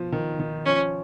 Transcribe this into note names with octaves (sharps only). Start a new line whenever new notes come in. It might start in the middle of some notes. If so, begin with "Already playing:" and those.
Already playing: B2 F3
D#3
D#3
F3 C#4